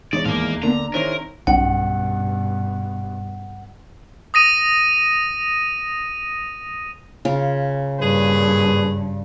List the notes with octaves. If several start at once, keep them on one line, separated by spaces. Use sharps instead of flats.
E2 G#3 D#4 C#5 D5
D#2 A2 A#4 F5 D6
D3 A#3 B3 D4 A#5
D#3 C4 D4 E4 G#4 A#4 C#5
B1 G2 B2 C#4 F#5
D#6 A#6 D#7
C#3 F4 A#4
G2 A#2 G#4 B4